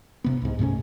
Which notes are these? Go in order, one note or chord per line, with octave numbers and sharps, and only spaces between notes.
D1 C3 B3
C2 G#2
G2 C3 A3 C#4